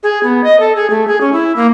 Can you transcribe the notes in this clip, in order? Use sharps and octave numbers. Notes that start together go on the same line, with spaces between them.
G#4
B3
D#5
A4
G#4
A3
G#4
C#4
E4
A#3